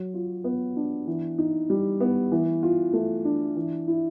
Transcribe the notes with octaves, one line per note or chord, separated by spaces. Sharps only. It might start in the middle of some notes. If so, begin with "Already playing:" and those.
Already playing: F#3
F4
B3
D4
E3
D#4
G3
B3
E3
F4
A3
D4
E3
E4